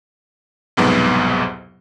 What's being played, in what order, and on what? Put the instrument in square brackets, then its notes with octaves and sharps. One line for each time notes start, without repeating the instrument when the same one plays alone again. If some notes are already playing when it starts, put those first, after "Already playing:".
[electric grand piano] C2 F2 G#2 B2 F#3 B3